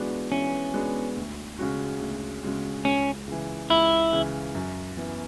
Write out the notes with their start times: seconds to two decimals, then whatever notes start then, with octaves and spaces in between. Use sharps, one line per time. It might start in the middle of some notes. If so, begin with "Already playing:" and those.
Already playing: E3 G#3 B3 D4 F#4
0.31 E3 C#4
0.74 G#3 B3 D4 F#4
1.16 D2
1.59 C#3 G#3 C#4 F#4
2.01 D2
2.43 C#3 G#3 C#4 F#4
2.85 C#2 C#4
3.28 C#3 E3
3.70 C#2 E4
4.12 C#3 E3
4.55 F#2
4.97 E3 B3